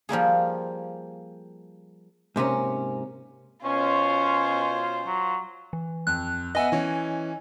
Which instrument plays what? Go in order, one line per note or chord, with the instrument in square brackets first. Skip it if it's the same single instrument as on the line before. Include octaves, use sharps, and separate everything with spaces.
[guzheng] F3 G3 A#3 G#4
[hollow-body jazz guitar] G#2 C3 A#3 C#4
[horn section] B2 C#4 [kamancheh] F4 C5 [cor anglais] C#5
[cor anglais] F#3
[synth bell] E3
[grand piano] F2 [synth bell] F#6
[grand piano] B3 E5 F#5 [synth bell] D#5 G#5
[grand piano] E3 C#4